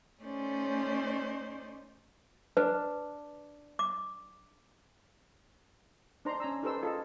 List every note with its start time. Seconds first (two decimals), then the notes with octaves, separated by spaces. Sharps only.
0.22 A3 C#4 D#4 C5 D5 C6
2.57 D4 B4
3.79 D6
6.25 D4 D#4 C5 A#5 C6
6.40 C#4 G#5 A#5 E6
6.63 D#4 G4 A4 B4 C5 E6
6.83 F4 G#4 A4 D#5